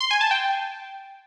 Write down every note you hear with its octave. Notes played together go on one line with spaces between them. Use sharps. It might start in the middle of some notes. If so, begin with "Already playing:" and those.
C6
G#5
A5
G5